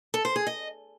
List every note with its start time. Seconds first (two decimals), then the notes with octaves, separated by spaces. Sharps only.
0.14 A4
0.25 C5
0.36 G#4
0.47 D#5